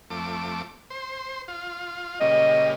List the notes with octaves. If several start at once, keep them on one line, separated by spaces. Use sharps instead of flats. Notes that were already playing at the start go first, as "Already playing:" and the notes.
F2 A3 D6
C5
F4
A#2 C#3 G3 D#5